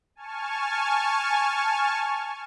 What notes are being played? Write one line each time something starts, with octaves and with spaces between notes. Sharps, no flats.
G#5 A5 C#6 F6